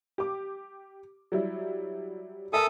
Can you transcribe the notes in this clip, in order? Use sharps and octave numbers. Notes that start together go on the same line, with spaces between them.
G4 D6
F#3 G3 E4
A4 A#4 E5 G#5 D#6